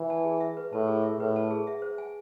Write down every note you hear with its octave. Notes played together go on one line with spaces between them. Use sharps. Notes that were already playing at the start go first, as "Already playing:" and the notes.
Already playing: E3
A5
G#4
E5
B4
A2 A5
G#4
E5
A2 B4
A5
G#4
E5
C5
G#5